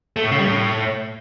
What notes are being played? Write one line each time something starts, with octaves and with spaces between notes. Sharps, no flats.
A3
A2
C#3
G3
A2